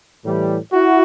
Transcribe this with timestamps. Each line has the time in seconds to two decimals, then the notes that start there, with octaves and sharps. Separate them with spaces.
0.23 A2 E3 G3
0.73 E4 F#4